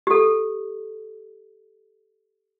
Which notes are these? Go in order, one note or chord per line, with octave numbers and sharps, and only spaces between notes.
G4 A4